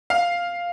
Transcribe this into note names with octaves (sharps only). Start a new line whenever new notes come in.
F5